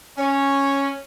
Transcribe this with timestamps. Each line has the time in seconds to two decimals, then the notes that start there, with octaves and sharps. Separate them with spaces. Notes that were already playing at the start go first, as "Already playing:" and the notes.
0.18 C#4 C#5